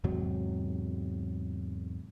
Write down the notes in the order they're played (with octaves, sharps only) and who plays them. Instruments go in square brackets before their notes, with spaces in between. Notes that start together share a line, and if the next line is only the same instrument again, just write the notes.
[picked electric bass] E2 G#2 C3 F#3